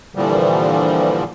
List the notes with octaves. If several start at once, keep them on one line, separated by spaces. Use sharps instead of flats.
A#2 D3 E3 F3 G3